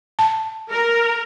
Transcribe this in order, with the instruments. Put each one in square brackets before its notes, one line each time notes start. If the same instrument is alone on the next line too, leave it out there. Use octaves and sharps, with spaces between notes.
[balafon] A5
[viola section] A#4